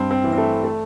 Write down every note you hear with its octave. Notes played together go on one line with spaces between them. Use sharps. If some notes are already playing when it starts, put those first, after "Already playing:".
Already playing: G2 C4
C4
E3
C4
A3
A3